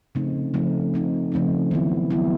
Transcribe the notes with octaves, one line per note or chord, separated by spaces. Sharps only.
C#3 F3 A3 C4 D#4
C#3 F3 A3 C4 D#4
C#3 F3 A3 C4 D#4
C#3 F3 A3 C4 D#4
D#3 F#3 B3 E4
D#3 F#3 B3 E4